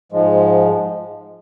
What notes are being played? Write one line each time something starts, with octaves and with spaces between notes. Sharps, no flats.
G#2 F3 G#3